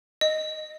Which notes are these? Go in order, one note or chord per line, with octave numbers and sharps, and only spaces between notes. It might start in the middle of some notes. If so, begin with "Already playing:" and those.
D#5